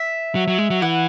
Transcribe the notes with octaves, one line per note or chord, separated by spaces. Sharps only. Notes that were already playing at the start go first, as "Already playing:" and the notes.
Already playing: E5
F#3
F#3
G#3
F#3
E3 F#5